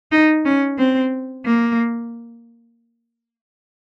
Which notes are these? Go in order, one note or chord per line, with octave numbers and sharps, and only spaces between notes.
D#4
C#4
C4
A#3